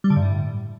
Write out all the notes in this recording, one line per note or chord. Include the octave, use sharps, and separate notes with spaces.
G3
D3
G2
A2